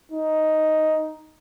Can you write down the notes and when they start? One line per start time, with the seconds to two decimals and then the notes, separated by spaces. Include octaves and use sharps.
0.12 D#4